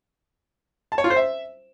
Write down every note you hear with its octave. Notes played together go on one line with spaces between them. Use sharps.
A5
C#5
F4
C5
E5